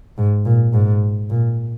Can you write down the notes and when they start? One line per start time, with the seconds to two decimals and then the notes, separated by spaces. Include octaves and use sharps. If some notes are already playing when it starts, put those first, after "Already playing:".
0.18 G#2
0.45 A#2
0.73 G#2
1.30 A#2